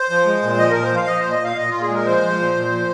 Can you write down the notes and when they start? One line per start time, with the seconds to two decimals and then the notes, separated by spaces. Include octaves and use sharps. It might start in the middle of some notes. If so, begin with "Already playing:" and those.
Already playing: C5
0.10 F3
0.26 G#3
0.43 A#2
0.58 F3 D#5
0.71 A#2 A#4
0.83 C5
0.91 F3 F5
1.07 F3 D#5
1.19 A#2 C5
1.31 D#5
1.40 A#2 F5
1.57 A#2 D#5
1.69 A#2 F4
1.81 G#4
1.89 G#3 A#4
2.06 F3 C5
2.22 F3
2.38 A#2
2.55 A#2
2.72 F3